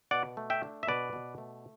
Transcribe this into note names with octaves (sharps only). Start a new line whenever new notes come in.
B2 D5 F#5
A3
E5 G5
D4
E5
B2 B4 D5
B2
A3